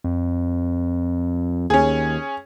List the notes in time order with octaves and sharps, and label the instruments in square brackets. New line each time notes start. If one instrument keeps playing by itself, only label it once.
[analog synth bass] F2
[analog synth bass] D#2 [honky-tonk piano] C#4 G#4